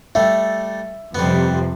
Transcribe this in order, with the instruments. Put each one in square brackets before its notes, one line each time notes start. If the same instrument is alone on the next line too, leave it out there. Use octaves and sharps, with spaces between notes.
[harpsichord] G3 A3 [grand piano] E5
[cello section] F2 C3 [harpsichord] G3 B3